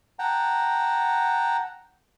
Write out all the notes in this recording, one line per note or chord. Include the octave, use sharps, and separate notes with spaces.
F#5 G5 A5 A#5